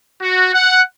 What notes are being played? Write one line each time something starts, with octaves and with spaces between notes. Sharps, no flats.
F#4
F#5